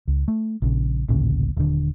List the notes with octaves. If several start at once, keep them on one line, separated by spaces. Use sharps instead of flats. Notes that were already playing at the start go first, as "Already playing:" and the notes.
C#2
A3
A#1 C#3
A1 D2 A#2 C#3
D#1 D3